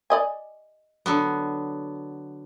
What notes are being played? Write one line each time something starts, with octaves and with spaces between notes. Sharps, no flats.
D5 D#5 G#5
D3 F#3 B3